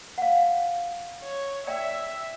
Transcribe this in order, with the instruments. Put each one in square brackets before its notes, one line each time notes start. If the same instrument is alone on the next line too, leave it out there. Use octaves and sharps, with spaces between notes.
[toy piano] F5 F#5
[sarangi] C#5
[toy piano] D5 G5 [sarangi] E5